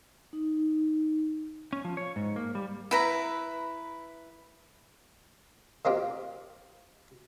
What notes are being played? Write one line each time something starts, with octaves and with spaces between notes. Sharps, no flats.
D#4
C#4
F3
C#5
G#2
A#3
G3
E4 B4 A#5
D#3 A#3 C4 D#4 F4 G4